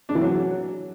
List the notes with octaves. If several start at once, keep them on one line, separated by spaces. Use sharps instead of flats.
D4
E3
F#3